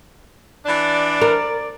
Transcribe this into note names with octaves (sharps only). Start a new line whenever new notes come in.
E3 D4 D5
A#4